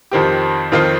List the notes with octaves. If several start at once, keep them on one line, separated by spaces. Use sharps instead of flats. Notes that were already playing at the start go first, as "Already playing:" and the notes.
F2 D#3 C4 G4
F2 D#3 C4 F4